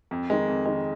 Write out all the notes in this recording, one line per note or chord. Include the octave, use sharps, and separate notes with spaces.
F2
D#3 G#3
F2
D#3 G#3